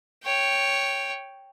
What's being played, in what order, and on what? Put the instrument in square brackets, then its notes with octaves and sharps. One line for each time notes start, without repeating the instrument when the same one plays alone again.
[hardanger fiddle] C#5 G5